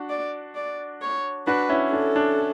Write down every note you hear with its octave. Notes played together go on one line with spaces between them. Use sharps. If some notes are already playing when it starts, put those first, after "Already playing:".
Already playing: D4 F#4
D5
D5
C#5
D4 F#4 B4
C#4 E4
D4 A4
D4